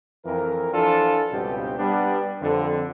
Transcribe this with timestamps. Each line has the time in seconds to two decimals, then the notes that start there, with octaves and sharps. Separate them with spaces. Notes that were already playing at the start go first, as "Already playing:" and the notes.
0.26 F2 E3 A#4
0.73 E3 F3 D4 F4 A4
1.31 C#2 G2 B2 B3 C4 G4
1.78 G3 B3 D4
2.42 F2 D3